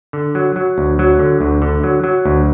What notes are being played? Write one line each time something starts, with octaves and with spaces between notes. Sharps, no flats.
D3
F#3
F#3
D2
F#3
D3
D2
D3
F#3
F#3
D2